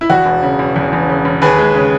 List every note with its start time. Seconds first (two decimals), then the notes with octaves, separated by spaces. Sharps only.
0.01 E4
0.10 E2 F#4
0.26 E1
0.43 C#3
0.59 E1
0.76 E2
0.93 E1
1.09 C#3
1.25 E1
1.42 D#2 G#4 B4
1.59 G#3
1.76 C#3